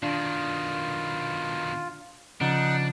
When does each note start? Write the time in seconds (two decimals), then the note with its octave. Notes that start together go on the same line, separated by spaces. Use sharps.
0.03 B2 D#3 D4 F4
2.41 C#3 F3 D4 D#4 F#5 F#6